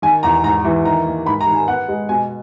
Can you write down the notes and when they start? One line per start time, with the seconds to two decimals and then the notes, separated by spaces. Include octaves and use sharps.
0.02 D#3 G#5
0.23 E2 A#5
0.43 G#2 A#5
0.65 E3
0.85 D#3 A#5
1.06 A#3
1.26 G#2 B5
1.41 A#5
1.47 D#3
1.54 G#5
1.68 B3 F#5
1.88 G#3
2.09 B2 G#5